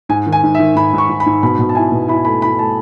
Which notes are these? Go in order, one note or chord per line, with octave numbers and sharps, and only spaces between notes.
G#2 G#5
D#3
G#5
G#2
E5
D#3
G#2 B5
G#2 C#6
G#2
B5
G#2
B2 B5
B2
A5
E4 G#5
B2
E4 B5
A3 B5
E4 B5
A3 A5